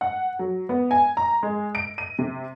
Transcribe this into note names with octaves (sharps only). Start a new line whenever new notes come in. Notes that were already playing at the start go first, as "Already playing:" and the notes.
F#5
F#3
B3
G#5
A#5
G#3
D7
D#7
C3